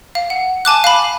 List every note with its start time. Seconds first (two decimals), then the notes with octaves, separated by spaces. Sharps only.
0.15 F5
0.30 F#5
0.65 G#5 A5 D6 F#6
0.84 F5 B5